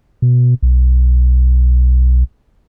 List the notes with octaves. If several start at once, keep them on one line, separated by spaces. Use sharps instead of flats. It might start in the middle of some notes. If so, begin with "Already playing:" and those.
B2
B1